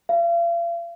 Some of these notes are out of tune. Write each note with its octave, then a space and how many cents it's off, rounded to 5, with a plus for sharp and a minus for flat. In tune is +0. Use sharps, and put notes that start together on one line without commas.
F5 -40